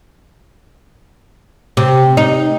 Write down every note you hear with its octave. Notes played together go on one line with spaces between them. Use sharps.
C3
D#4